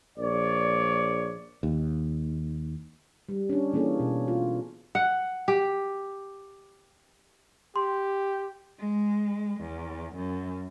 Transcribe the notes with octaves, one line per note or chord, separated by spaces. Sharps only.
A#1 C#5 D5
D#2
G3
C#4 D4
E3 A#3 C#4 G#4 A4
B2
F4
F#5
G4
G4 C6
G#3
E2
F#2